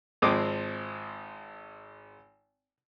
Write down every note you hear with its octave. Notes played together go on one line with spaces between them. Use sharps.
G#1 F3 G#3 C4 D6 D#6